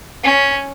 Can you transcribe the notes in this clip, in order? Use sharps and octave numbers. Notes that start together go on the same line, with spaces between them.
C#4